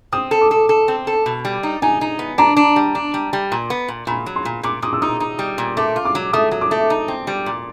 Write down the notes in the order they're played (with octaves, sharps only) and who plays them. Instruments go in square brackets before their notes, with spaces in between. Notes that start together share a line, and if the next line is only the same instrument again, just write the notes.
[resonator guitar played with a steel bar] C4 [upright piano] D#6
[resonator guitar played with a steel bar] A4
[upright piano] D6
[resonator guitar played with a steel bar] A4
A4
C4
A4
B2
G3
D#4
[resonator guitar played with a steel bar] D#4 [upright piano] G#5
[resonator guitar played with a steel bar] D#4
B3
[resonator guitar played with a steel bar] D4 [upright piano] A#5
[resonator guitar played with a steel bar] D4
G3
D4
G3
G3
A#2
B3
A#2
[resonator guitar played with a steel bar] A#2 [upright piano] B5
[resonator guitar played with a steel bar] F#3
[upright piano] C6
[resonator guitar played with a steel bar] A#2
[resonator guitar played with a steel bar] A#2 [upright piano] D6
[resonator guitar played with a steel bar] A#2 [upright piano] D#6
[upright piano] E6
[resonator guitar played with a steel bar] D#4 [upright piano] D#6
[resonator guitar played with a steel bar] D#4
G3
A#2
[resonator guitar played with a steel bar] A3 [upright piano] D6
[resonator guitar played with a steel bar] F4
[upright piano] D6
[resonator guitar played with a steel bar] F#3
[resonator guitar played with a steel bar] A3 [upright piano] D#6
[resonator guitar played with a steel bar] F#3
[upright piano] D6
[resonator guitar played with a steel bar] A3
D#4
C4
G3
A#2